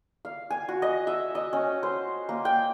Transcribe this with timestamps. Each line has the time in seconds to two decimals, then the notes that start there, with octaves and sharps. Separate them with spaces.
0.25 F5
0.50 G#5
0.69 F#4
0.82 D#5
1.07 E5
1.35 D#5
1.53 C#4
1.83 C5
2.29 A#3
2.45 G5